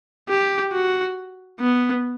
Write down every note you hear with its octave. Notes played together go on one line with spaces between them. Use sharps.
G4
F#4
B3